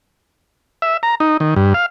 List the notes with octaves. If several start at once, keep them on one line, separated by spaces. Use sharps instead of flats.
E5
A#5
D#4
D#3
G2
F5